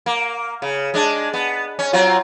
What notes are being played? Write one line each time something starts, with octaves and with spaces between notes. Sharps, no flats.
A#3
C#3
G#3 D4
B3
C#4
F#3 C4 F4